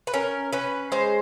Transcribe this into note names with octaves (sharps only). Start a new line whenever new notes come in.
B4
C#4 A#4
C#4 B4
G#3 C5